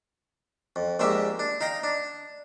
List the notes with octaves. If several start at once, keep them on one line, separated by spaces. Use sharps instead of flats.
F2
A#1 G#3 A#3 G4 E5
D4
D#4 F5 G5 A#5
D4